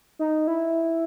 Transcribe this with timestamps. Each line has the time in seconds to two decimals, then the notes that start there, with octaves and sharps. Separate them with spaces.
0.19 D#4
0.47 E4